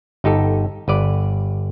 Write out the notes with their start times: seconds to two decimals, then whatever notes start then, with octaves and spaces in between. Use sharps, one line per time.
0.24 G1 D#4 G4 A4
0.88 G1 B4 D5